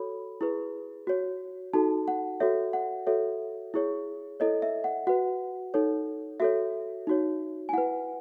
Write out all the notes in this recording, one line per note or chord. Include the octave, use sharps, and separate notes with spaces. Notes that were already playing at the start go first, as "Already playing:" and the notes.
Already playing: F#4 A4 C#5 B5
E4 G#4 B4
F#4 C#5
D#4 F#4 A4 A5
F#5
F#4 A4 C#5 E5
F#5
F#4 A4 C#5 E5
E4 G#4 C#5
E4 A4 C#5 D#5
E5
F#5
F#4 B4 F#5
D#4 A4 C#5
F#4 A4 C#5 E5
D#4 F#4 C#5
G#5
E4 B4 F#5